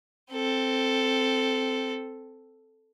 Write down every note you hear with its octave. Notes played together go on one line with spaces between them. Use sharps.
C4 A4